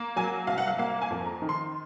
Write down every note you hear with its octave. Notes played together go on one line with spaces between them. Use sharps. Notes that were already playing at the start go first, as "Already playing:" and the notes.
Already playing: A#3
F#3 G#5
C2 F5
F#5
F5
A#3 F5
G#5
F2
A#5
D#3
C6